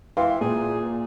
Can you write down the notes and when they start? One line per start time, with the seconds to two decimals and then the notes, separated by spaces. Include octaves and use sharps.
0.17 E3 F5 G5 C6
0.41 A#2 G#4